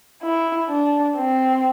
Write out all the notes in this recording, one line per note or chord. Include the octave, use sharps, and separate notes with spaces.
E4
D4
C4